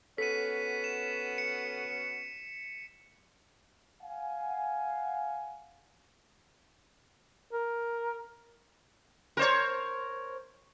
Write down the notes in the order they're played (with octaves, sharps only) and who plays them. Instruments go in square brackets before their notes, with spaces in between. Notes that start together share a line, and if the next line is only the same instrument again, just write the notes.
[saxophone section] B3 C#4 F#4 [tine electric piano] A4 [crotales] B6 D#7
[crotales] E7
C#7
[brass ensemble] F5 F#5 G#5
[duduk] A#4
[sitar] A#4 C5 C#5